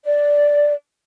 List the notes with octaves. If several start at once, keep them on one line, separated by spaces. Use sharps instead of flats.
D5